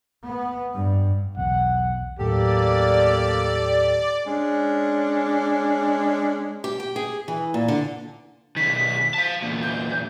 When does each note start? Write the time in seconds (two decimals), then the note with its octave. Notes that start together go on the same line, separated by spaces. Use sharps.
0.24 B3
0.74 G2
1.37 B1 E2 F#5
2.19 D#2 A2 F#3 A#3 G4 A4 D5
4.26 G#3 C#4 D4
6.64 G4
6.80 G5
6.96 G#4
7.28 E3
7.54 A#2
7.68 D3
8.57 B2 D#3 B6
9.14 F5 A5
9.43 E2 A#2
9.62 G6